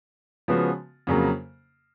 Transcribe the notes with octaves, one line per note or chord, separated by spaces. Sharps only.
C#3 F3 G#3 B3 F#4
F2 C#3 F#3 A#3